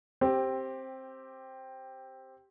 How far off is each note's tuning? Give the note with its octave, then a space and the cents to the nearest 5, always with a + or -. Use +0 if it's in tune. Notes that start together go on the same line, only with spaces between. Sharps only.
C4 +10 G4 +0